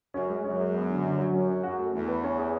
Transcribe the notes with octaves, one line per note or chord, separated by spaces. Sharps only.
F#2 C#4
G#3
F#2 C#4
G#3
B3
D3
D3
F#3
F#2 C#4
C#4
F#2 F#4
A3
E2 A3
B4
C#4
G#4